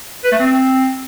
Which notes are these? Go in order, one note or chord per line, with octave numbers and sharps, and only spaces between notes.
B4
A3
C4